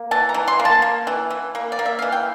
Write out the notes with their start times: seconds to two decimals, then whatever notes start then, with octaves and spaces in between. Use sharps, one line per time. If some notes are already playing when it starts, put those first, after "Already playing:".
Already playing: A#3
0.11 E3 A5
0.29 A#5
0.34 E3
0.48 C6
0.59 A#3
0.65 A5
0.82 A#3
1.07 E3
1.30 E3
1.55 A#3
1.72 D5
1.79 A#3
1.86 E5
1.99 E3 F5
2.12 G5